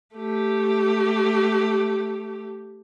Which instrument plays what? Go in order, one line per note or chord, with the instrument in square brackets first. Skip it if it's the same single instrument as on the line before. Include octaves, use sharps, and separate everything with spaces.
[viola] A3 G4